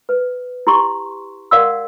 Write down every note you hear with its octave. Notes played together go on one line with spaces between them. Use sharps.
B4
E4 G4 C6 C#6
A#4 D5 F5 F#5 C6 E6